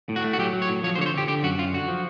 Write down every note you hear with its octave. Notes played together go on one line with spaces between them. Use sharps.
A2
F#4
A3
F#4
F#3 G4
F#3
C#5
A2
F3 C#5
C5
D3 C#5
C5
D3 G4
D3 G4
F#2 F#4
F#2 F4
D3 F#4
F3